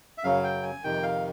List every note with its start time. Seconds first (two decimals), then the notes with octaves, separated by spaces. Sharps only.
0.18 E5
0.24 F#2 C#3 F#3 F5
0.44 G5
0.63 G#5
0.84 F2 C3 D#3 G5
1.03 F5